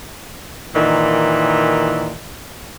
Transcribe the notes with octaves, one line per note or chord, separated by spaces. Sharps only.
A#2 D#3 E3